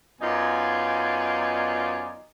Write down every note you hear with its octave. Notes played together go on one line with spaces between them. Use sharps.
F#2 B3 D#4 F4 D5 G#5